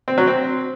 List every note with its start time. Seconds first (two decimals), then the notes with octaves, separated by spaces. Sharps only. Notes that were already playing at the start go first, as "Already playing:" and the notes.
0.08 C4
0.18 F#3
0.27 C4